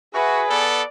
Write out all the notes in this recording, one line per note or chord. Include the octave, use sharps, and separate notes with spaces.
F#4 G#4 B4 E5
B3 A4 D5